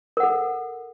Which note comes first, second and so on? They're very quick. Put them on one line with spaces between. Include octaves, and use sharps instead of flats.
A#4 F#5 A4